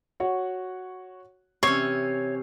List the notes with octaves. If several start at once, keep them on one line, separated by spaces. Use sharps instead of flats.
F#4 C#5 F#5
C3 E3 C#4 C#5 C7